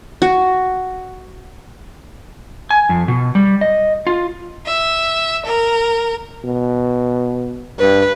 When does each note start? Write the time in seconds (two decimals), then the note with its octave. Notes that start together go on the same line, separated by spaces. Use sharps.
0.22 F#4
2.70 G#5
2.89 F2
3.08 B2
3.35 G3
3.61 D#5
4.07 F4
4.65 E5
5.44 A#4
6.44 B2
7.80 G2 B4